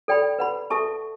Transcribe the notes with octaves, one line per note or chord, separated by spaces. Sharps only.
A4 D5 G5 B5
B4 F#5 B5
A4 E5 A5 C#6